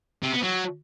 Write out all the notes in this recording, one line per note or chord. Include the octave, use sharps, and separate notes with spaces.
C3
B3
F#3